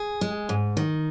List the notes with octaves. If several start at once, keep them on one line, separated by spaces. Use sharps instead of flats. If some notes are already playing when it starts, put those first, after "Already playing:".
Already playing: G#4
G#3
G#2
D#3